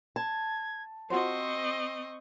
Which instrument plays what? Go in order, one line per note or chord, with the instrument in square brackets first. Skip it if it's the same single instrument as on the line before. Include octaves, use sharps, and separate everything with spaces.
[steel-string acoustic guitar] A5 [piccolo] G#6
[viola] C4 D#5 [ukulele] F4 F#4 C5 [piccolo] C#6